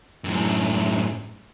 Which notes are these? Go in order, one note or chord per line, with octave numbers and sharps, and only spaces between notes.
F#2 A2